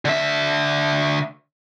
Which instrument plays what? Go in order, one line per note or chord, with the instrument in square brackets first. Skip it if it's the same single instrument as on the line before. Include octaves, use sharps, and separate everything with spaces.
[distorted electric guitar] D3 E5